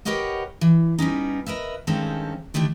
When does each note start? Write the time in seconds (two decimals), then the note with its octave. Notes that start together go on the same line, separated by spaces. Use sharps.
0.05 G4 A#4 B4 C#5 D#5 F#5
0.61 E3
0.99 G3 B3 C#4 D#4
1.46 A#4 B4 D#5 E5
1.87 G2 D#3 G#3 C4 C#4 A4
2.54 D3 D#3 A3 D4 G4